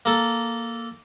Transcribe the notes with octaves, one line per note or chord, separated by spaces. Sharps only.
A#3 A4